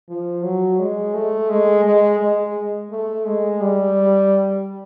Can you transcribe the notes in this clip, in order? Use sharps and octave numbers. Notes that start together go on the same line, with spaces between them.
F3
F#3
G#3
A3
G#3
G#3
G#3
A3
G#3
G3